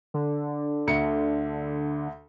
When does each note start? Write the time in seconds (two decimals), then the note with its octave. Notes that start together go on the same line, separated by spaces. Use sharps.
0.14 D3
0.87 D2 C#7